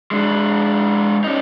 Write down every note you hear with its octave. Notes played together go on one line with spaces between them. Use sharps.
G#3 D4
C#4 D#4